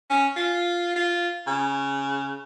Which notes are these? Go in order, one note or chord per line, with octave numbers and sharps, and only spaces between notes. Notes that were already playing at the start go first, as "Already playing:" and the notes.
C#4
F4
F4
C#3